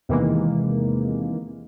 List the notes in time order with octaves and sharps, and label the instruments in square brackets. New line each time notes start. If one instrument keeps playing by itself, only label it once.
[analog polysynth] E2 C3 D#3 E3 G#3 A#3